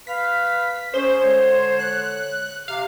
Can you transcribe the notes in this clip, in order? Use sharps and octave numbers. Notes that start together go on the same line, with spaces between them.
B4 F5 B6
C#4 G#4 C5
D3 G#3 C#5
F#6
C3 F5